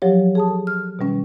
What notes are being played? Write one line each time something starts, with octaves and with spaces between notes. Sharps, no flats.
F3 F#3 G4 C#5
G#4 A5 D#6
A4
F6
B2 D#3 G3 C#4